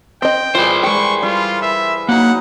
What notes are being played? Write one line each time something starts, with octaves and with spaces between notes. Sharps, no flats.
C4 D#5 G5
E3 G3 F4 G#4 A#4 C5
G#3 G5 B5 C#6
G3 F4
B4 E5
F#3 A#3 D#4 F#5